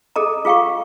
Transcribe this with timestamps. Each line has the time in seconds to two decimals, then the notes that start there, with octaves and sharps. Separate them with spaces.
0.16 G#4 A4 D#5 A#5
0.45 F4 G#4 F5 G5 C#6